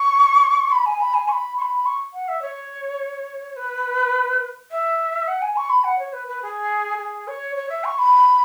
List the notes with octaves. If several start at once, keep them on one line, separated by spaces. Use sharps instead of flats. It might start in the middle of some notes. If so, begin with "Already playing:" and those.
Already playing: C#6
B5
G#5
B5
G#5
C#6
B5
C#6
B5
C#6
F#5
E5
C#5
B4
E5
F#5
G#5
C#6
B5
F#5
C#5
B4
B4
G#4
G#4
C#5
C#5
E5
C#6
B5